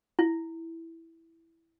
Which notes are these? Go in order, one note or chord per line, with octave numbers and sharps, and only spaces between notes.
E4